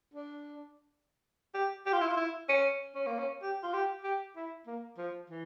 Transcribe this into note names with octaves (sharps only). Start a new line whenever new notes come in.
D4
G4
G4
F4
E4
F4
E4
C#4
C#4
A#3
C#4
G4
F4
G4
G4
E4
A#3
F3
E3